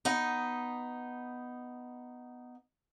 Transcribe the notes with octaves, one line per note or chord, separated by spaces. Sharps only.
B3 D#4